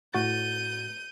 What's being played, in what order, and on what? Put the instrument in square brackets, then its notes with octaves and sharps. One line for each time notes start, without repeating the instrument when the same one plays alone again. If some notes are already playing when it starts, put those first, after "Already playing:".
[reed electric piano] A2 F#4 A6 [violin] G6 D#7